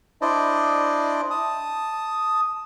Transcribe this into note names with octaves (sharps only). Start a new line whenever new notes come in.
D4 E4 C5 D5 D#5
A5 D#6